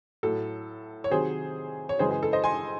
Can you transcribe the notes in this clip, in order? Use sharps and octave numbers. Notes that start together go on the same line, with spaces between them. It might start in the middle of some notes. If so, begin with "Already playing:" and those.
A2 F#3 A4
C#5
C3 D#3 F#3 G#4 C5
C#5
F#2 C#3 E3 G#3 G#4 C5
G#4
A4
C5 D#5
G#5 C6